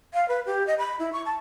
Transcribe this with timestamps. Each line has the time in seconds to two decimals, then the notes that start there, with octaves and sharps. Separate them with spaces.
0.14 F5
0.28 B4
0.46 G4
0.67 D#5
0.79 B5
0.99 E4
1.13 C#6
1.26 A5